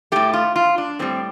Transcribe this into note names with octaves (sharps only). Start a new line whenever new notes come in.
A2 A3 G4
F4
F4
D4
A2 G3 C4